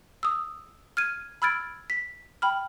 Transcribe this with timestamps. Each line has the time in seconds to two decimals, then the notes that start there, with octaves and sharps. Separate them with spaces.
0.23 D#6 E6
0.97 F6 G#6 D#7
1.42 B5 E6 F6 G#6 A6 D7
1.90 B6
2.42 G5 B5 F6